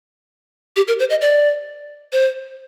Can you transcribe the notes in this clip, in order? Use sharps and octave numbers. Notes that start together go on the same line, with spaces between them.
G4
A#4
C5
D#5
D5
C5